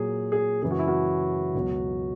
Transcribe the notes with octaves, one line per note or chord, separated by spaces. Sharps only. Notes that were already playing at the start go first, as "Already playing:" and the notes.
Already playing: A#2 F#3 G#4
G#4
F#2 C#3 E3 G#3 G#4
F#4
E4
F#4
C#2 B2 F#3